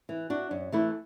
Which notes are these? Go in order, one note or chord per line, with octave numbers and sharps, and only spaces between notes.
E3
D4 F#4
F#2
E3 A3 E4